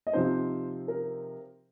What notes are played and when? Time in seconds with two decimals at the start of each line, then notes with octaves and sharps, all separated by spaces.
0.07 D#5
0.13 C3 F3 C4 D#4 C5
0.88 A#4